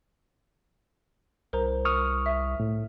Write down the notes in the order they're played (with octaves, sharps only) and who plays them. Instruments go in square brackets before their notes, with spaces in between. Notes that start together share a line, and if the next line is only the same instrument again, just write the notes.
[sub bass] C2 [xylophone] A#4 C5 A#5
[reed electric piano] C#6 D#6 F6
[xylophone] E5
[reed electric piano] A2